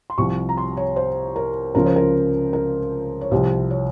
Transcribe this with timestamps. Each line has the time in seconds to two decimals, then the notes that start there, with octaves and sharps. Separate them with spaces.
0.10 C6
0.18 C2 C3 F3 C#6
0.49 A#5
0.57 C6
0.77 C#5
0.96 C5
1.36 A#4
1.75 C#2 C#3 F3 A#4
1.86 C5
1.96 A#4
2.53 A#4
3.21 C#5
3.31 C2 C3 F3 C5
3.70 C#5